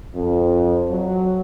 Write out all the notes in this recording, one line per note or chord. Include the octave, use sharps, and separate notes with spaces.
F2
F#3